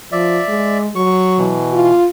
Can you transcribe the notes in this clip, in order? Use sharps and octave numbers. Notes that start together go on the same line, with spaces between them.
F3 D5 E5
G#3
F#3 C#6
B2 E3
F4